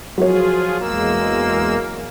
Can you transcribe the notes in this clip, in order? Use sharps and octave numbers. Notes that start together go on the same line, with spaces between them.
F3 F#3 F4 G#4 C#5
E2 G#3 A#3 E6